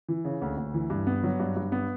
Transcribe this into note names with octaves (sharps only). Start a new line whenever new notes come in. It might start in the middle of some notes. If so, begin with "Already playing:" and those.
E3
C#3
D2
D2
E3
G2
B3
F#3
G2
G2
B3